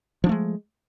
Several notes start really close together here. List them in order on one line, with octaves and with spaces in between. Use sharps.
F3 D4 A3 G#3